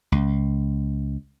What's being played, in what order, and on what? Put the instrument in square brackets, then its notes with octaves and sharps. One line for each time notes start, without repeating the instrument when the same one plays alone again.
[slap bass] C#2